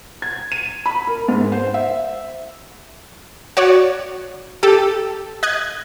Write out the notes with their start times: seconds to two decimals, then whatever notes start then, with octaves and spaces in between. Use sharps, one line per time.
0.22 G#6
0.52 D#7
0.86 B5
1.07 A#4
1.28 G#2
1.52 C5
1.74 E5
3.57 F#4 C#5 D5
4.63 G4 A4
5.43 D#5 F#6 G#6